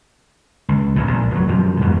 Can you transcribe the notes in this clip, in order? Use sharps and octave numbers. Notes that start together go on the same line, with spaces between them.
C#2
A1 A2
A#1
F1 F#3
F#2 B2 F3
F2 G#2 B2 E3